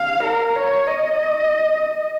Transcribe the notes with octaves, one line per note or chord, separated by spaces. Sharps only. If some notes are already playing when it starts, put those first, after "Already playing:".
Already playing: F5
A#4
C#5
D#5